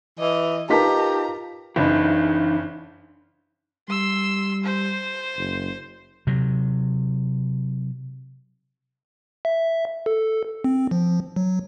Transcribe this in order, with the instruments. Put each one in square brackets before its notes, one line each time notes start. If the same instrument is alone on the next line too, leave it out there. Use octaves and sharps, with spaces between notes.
[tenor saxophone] E3 [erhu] D#5
[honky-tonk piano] D#4 A#4 A5 [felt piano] F4 B4 B6 [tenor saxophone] G4 [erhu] A#5
[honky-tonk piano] F#1 C#3 [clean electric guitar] E3 D4 D#4
[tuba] G3 [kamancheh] C6 E6
[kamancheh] C5
[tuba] F#1
[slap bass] C3 F#3
[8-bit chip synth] E5
A4
C4
F3
F#3